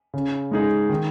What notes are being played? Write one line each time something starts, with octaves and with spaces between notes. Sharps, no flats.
C#3
G#3 D#4 G#4
D#3